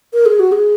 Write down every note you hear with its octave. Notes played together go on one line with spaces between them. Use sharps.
A#4
G#4
F#4
G#4